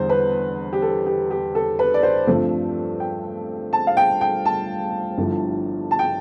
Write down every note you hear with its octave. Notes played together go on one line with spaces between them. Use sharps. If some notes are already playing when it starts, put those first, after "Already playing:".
Already playing: E2 D3 G3 C5
B4
G4
A4
G4
G4
A4
B4
D5
C5
G2 F3 A3 C4
G5
A5
F5
G5
G5
A5
G1 G2 F3 A3 E4
A5
G5